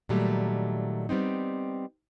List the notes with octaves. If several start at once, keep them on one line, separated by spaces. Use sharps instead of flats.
A#2 D#3 F#3 G3 A3
G3 B3 C4 D#4